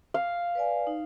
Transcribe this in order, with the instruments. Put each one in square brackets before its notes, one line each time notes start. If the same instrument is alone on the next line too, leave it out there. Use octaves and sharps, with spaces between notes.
[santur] F5
[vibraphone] B4 D5 G#5
D#4